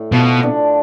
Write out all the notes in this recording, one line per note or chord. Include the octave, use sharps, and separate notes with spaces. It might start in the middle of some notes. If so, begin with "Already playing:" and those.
Already playing: A2
B2 F3
D4